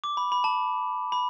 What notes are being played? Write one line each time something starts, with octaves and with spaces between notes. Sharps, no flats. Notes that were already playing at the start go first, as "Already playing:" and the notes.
D6
B5
B5
A5
B5